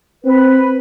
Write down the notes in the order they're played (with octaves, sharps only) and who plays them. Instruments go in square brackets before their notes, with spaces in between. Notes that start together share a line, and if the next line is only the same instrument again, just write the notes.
[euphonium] C4 [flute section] B4